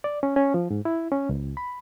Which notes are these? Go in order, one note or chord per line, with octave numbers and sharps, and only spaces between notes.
D5
C#4
C#4
F3
G#2
E4
C#4
C#2
B5